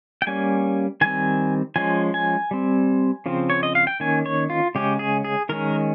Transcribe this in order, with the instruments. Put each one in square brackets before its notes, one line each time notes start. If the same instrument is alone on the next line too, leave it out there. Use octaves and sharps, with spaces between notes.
[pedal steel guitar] G5
G3 A#3 C#4 G#5
D#3 G3 C4 G#5
F3 G#3 C#4 G#5
G#5
G3 C4
C#3 F3 C4
C#5
D#5
F5
G5
D#3 A#3 C#4 G#5
C#5
F4
C#3 G#3 C#4 G4
G#4
G#4
D#3 G#3 C#4 A#4